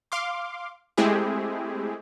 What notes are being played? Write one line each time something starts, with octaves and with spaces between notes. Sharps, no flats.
F5 C6 D6
G#3 A3 C4 E4 G4 G#4